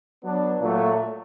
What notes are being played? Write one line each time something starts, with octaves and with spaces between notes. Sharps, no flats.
F#3 B3 D4
A#2 F#3 A3